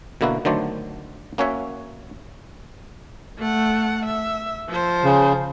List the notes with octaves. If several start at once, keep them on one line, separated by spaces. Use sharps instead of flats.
B2 D3 A#3 E4 F#4
D3 D#3 F#3 A3 C5 D5
A#3 C#4 F#4 C#5 E5
A3 F#5
E5
F3 C5
C#3